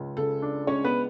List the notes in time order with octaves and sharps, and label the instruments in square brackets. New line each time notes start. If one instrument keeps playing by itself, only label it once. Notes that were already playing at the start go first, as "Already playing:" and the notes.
Already playing: [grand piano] C#2 G#3
[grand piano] C#3 [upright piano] A4
[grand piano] D4
[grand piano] G#3 [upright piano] C#4 C#5
[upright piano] B3 B4